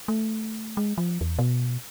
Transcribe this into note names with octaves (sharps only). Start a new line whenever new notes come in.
A3
G#3
F3
E2
B2